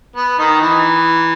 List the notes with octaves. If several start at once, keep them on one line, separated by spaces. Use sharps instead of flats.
B3
D#3 D#4
E3